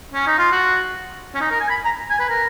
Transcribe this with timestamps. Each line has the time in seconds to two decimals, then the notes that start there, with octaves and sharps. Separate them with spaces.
0.14 C#4
0.27 D#4
0.39 F4
0.52 F#4
1.35 C#4
1.41 D#4
1.51 A#4
1.60 G#5
1.70 B5
1.85 A#5
2.10 G#5
2.19 B4
2.29 A#4